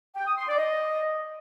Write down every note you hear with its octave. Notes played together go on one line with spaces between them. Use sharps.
G5
D#6
C6
D5
D#5